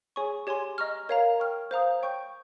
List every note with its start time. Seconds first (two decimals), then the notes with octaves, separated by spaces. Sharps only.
0.16 G#4 C#5 G#5 C#6
0.47 G4 C#5 G#5 C6
0.78 D#5 A#5 C#6 F6
1.09 A#4 C#5 F5 A#5
1.40 C#5 G5 C#6 F6
1.71 C5 F5 A#5 D#6
2.01 C#5 G5 C#6 G6